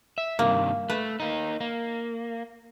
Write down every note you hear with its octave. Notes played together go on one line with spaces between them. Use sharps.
E5
G2 C3 D#3 A#3
A3 B4
A#3 D#4
A#3